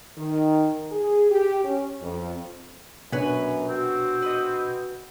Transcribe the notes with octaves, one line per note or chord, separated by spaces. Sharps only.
D#3
G#4
G4
C#4
F2
F#2 B2 D4 B4 C#5 G#5
C4 F#4
B4 D#5